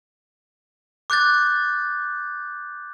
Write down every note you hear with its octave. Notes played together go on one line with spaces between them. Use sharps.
D6 F#6 G6 A6